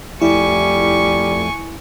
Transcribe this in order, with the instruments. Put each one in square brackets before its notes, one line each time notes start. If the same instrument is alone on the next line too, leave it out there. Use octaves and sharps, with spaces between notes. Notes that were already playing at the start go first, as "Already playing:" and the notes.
[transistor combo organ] F2 A3 [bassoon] G3 [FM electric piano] E4 [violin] G#5 C#6